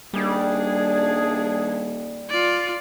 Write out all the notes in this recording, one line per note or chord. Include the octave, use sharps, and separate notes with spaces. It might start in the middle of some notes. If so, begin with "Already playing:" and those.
D#1 G3 D4 G#4
F4 D5